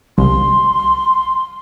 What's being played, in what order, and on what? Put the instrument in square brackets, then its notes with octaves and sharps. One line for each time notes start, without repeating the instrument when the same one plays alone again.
[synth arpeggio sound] C2 [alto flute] C6